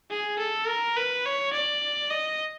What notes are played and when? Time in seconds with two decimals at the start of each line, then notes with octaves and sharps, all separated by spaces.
0.10 G#4
0.39 A4
0.67 A#4
0.97 B4
1.25 C#5
1.53 D5
2.10 D#5